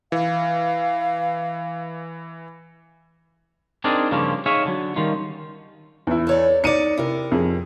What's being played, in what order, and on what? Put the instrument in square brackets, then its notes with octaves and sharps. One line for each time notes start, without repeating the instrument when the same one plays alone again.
[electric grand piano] E3 [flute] F5
[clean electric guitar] C4 D4 D#4 G#4 A#4 D5
G2 C#3 F3 G3 A#3 C#4
D#4 G#4 C#5 E5 F5 G#5
D3 F#3
D#3 G3 C#4 D#4 F4
[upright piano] E2 E4
[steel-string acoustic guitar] A4 C#5 D5
[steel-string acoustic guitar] D#4 D5 [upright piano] C#7 D#7
[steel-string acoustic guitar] C3 A#4 [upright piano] E4
[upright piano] F2 G#4